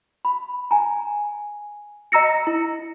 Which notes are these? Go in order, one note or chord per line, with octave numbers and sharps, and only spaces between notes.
B5
G#5 A#5
D#5 A#5 E6 A#6 C#7
E4